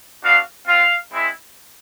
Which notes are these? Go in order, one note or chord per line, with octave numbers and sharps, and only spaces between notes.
B3 D4 F#4 F5
C4 F4 F5
G#3 C4 E4